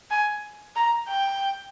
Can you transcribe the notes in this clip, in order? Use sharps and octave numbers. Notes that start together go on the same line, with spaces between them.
G#5
A#5
G5